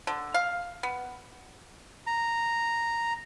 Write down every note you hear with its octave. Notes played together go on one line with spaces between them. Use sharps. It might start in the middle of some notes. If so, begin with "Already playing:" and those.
D3
F5
B3
A#5